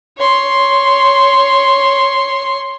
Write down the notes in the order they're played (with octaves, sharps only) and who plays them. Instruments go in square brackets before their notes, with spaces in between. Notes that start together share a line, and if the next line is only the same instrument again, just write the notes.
[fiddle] C#5 C6